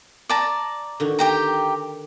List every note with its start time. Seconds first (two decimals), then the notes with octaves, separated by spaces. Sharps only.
0.29 D5 A5 A#5
1.00 D3 D#3 F#4
1.19 G4 G5 A#5